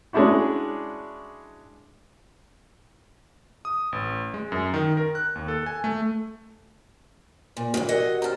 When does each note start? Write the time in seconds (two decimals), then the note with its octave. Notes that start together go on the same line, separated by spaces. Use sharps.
0.13 G#3 C#4 D4 E4 F#4
3.65 D#6
3.92 A1
4.34 G#3
4.52 F#2
4.74 D#3
4.97 A#4
5.15 F#6
5.35 D#2
5.48 A4
5.66 G#5
5.84 A3
7.57 A#2
7.74 A2 E3
7.89 F#4 G4 A#4 D#5 F#5
8.22 C5 A5 A#5 F6